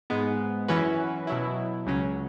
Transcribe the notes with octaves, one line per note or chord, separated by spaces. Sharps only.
G#2 G#3 B3
F#2 E3 C#4 F#4 B4
B2 F#3 E4
C#2 C#3 F#3 C#4